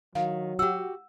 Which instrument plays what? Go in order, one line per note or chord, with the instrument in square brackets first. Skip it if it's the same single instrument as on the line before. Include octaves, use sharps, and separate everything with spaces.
[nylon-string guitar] D#3 [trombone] F#3 [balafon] F5
[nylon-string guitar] F#4 G4 [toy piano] F#5 E6